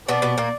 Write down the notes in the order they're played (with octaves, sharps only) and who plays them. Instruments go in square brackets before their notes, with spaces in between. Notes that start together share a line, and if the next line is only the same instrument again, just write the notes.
[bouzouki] B2 B3 [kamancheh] D5
[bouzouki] B2 B3
A#2 A#3